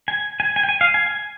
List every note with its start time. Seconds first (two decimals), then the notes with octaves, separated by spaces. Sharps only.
0.08 G#5
0.40 G#5
0.56 G#5
0.63 G5
0.69 G#5
0.81 F5
0.94 G#5
1.06 G#5